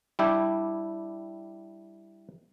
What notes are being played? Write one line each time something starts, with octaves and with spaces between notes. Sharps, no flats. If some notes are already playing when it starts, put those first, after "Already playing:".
G3 D4 E4 G4